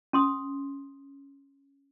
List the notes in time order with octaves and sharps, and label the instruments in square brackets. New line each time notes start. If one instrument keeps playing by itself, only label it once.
[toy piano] C#4 C6 D#6